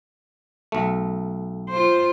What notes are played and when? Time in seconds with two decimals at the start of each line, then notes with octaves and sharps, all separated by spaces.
0.72 B1 A3
1.70 F4 C5